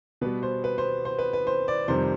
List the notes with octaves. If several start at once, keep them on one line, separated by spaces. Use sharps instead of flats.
B2 G3 B3 B4
C5
B4
C5
C5
B4
B4
C5
D5
F2 C3 D#3 G3 C5